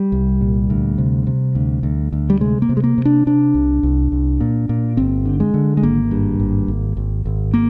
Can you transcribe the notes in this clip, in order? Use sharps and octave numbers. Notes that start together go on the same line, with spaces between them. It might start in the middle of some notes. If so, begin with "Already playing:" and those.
Already playing: G3
C2
A#2
D2
C3
C3
D2
D2
D2
G3
C3 G#3
A#3
C3
G#3
A#3
C3
D4
C3 D4
C2
C2
C2
A#2
A#2
G1 C4
D3
G#3
D3
G#3
G#1 A#3
G2
G#1
G#1
G#1
G#1
A#3